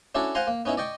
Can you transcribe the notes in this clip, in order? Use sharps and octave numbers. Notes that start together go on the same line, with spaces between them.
C#4 D4 E4 F#4 A4 D5
C5 F5 F#5 G#5 A#5 C6
A#3
B3 C#4 D#4 E4
D5 D#5 G5 C#6